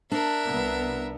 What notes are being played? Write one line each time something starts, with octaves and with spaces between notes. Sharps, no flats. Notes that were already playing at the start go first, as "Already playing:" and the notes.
D4 A#4 E5
C2 B3